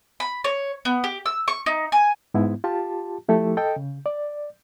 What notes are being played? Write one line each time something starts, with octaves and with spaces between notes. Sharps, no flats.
B5
C#5
B3
G4
E6
C#6
D#4
G#5
G#2 G#3 B3 E4
F4 G4 A5
F3 A3 E4 G4 A4
A4 D#5 G5
C#3
D5